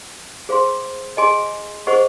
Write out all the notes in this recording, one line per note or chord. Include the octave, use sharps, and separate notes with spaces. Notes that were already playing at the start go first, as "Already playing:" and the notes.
G#4 C5 F5 C6
G#4 D#5 G#5 C6
G#4 C5 D#5 F#5 C#6